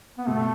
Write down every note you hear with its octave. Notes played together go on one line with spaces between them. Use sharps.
B3
B2 A3